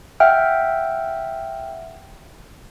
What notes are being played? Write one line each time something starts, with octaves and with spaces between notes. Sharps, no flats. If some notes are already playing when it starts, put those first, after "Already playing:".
E5 F#5 G5 F6